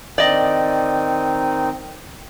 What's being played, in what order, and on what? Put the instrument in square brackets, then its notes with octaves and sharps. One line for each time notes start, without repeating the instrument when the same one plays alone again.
[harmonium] D#3 C4 D#4 [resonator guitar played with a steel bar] D5 D#5